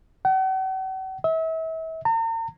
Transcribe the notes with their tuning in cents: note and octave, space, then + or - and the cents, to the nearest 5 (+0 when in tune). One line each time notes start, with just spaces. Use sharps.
F#5 +45
E5 -35
A#5 -45